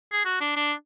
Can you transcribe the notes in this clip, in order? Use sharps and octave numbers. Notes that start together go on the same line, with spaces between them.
G#4
F#4
D4
D4